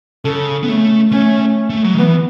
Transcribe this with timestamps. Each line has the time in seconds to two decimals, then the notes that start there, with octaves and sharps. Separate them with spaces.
0.25 C#3 A4
0.63 B3
0.68 A3 C#4
1.12 A3 C#4
1.70 A3
1.84 F#3
1.94 D#3
1.98 E3 B3